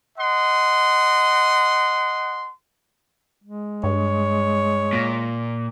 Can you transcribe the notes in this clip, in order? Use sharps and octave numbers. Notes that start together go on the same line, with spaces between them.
D#5 F#5 C6
G#3
G2 C#5
A#2